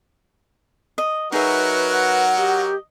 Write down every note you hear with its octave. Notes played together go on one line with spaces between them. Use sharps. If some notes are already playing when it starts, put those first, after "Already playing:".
D#5
F#3 D#4 F#4 G#4 A#4 B4 E5
F#5
G4 D#5